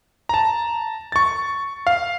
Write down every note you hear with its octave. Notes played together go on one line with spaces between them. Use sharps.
A5 A#5
C#6 A6
F5